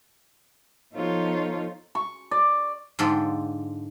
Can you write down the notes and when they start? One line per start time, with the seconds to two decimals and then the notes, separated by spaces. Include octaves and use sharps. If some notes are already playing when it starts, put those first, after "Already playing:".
0.94 F3 B3 D#4 F4 A4 C#5
1.95 C#6
2.31 D5
2.99 G#2 D3 G#3 F4 G4 A4